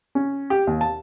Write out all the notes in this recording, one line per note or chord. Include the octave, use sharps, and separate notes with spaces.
C#4
G4
D#2
A5